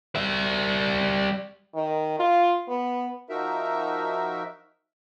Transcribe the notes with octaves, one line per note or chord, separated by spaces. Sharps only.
G3 E5
D#3
F4
B3
F3 D#4 F#4 A#4 E5